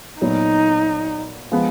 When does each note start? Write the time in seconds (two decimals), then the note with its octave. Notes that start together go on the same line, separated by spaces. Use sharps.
0.21 A#2 F#3 B3 D#4
1.52 F3 G#3 B3